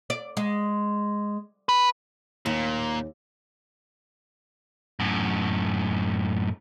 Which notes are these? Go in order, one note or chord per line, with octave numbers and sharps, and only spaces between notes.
D5
G#3
B4
D#2 A#2
F#2 A2